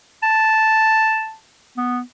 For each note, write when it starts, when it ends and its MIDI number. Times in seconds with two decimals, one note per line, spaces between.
0.23 1.34 81
1.77 2.00 59